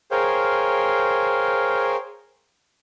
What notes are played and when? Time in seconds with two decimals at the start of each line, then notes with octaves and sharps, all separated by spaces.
0.11 G#4 A#4 C5 C#5 F5 G5